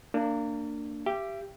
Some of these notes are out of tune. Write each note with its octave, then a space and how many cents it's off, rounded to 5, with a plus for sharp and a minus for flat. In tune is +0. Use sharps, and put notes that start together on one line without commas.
A#3 -25 D4 +5
G4 +0 E5 +40 G5 +0